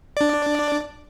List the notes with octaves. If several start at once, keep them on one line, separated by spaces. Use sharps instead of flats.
D4 D5